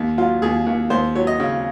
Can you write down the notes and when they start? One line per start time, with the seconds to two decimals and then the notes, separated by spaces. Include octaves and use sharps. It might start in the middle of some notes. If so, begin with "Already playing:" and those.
Already playing: D#2
0.18 F#3 F4
0.42 D#2 G#4
0.66 D#2
0.90 D#2 C5
1.16 F#3 C#5
1.27 D#5
1.40 C#3